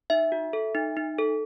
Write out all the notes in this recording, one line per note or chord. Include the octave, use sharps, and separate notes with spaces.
D#4 E5
F#4
A4
D#4
D#4
A4